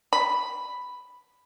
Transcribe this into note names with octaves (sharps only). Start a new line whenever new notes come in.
B5